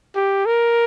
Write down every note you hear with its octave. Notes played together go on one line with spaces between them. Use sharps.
G4
A#4